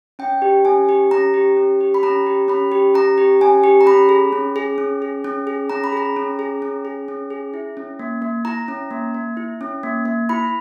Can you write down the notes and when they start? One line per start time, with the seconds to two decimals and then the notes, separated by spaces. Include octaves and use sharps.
0.19 C#4 G5
0.42 G4
0.65 C#4 G#5
0.89 G4
1.11 C#4 A#5
1.34 G4
1.57 C#4
1.81 G4
1.94 B5
2.03 C#4 A#5
2.27 G4
2.48 C#4 B5
2.72 G4
2.94 C#4 A#5
3.18 G4
3.41 C#4 G#5
3.64 G4
3.81 A#5
3.86 C#4 B5
4.09 G#4
4.32 C#4
4.56 G#4
4.78 C#4
5.02 G#4
5.24 C#4
5.47 G#4
5.70 C#4 A#5
5.84 B5
5.92 G#4 A#5
6.16 C#4
6.39 G#4
6.62 C#4
6.85 G#4
7.08 C#4
7.30 G#4
7.54 E4
7.77 C#4
7.99 A#3
8.22 A#3
8.45 E4 A#5
8.68 C#4
8.91 A#3
9.14 A#3
9.37 E4
9.61 C#4
9.83 A#3
10.05 A#3
10.29 E4 B5